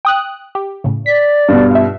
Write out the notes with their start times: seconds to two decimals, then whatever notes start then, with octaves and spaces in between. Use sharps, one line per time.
0.05 G5 D#6 F#6
0.55 G4
0.84 A2 C#3
1.06 D5 B6
1.48 G2 B2
1.71 F4 E5